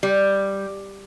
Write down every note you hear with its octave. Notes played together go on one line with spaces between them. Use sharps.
G3